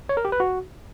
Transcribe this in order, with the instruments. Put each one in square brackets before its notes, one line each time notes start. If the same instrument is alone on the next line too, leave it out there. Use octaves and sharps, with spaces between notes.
[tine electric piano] C#5
A#4
G4
B4
F#4